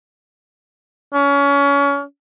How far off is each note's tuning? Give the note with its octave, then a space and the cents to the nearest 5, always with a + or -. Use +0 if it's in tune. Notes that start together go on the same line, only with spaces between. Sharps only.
C#4 +30